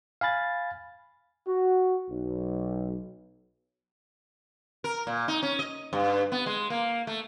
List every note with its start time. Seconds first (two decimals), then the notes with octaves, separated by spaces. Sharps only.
0.21 F5 G#5 B5 A6
1.47 F#4
2.10 B1
4.84 A#4
5.07 A#2
5.28 D#4
5.43 C#4
5.59 D#5
5.93 G2
6.32 B3
6.46 G#3
6.70 A#3
7.07 A3